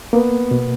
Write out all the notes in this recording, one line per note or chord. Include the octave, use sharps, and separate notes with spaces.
A#3 B3
B2